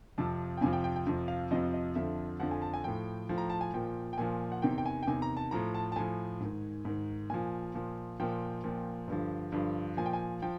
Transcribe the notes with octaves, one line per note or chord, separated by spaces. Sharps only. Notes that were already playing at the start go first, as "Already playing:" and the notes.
F2 C3 F3 A5
G5
F2 C3 F3 G#5
G5
G5
G5
F2 C3 F3
F5
F2 C3 F3 D#5
D#5
F2 D3 F3 E5
F2 D3 F3 F#5
G#5
A5
G#5
A2 F3 G5
A2 F3
A#5
A5
G#5
A#2 F3 G5
G5
A#2 F3 G#5
F#5
E2 C3 D#3 G5
G5
G#5
G5
E2 C3 D#3 G#5
A#5
A5
A2 F3 A#5
A5
A5
A2 F3 G#5
G#2 D#3
G#2 D#3
A#2 F3 G#5
A#2 F3
A#2 F3 G5
A#2 F3
G2 D3 F3
G2 D3 F3
A#2 F3 G#5
G5
G#5
F3 G5